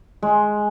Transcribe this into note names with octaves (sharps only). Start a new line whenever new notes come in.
G#3